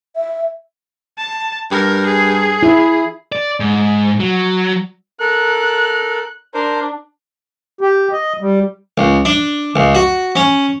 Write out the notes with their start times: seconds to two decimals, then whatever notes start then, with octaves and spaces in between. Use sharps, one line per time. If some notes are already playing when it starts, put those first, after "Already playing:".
0.16 E5
1.18 A5
1.71 G2 A#4
2.07 G#4
2.63 E4
3.32 D5
3.60 G#2
4.20 F#3
5.20 A4 A#4 F#6
6.54 D4 A#4 C5
7.81 G4
8.12 D#5
8.41 G3
8.98 C#2
9.25 D4
9.76 C#2
9.95 F#4
10.36 C#4